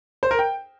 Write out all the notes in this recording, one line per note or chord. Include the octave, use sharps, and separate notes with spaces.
C5
A#4
G5